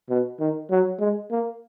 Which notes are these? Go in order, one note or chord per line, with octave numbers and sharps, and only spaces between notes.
B2
D#3
F#3
G#3
A#3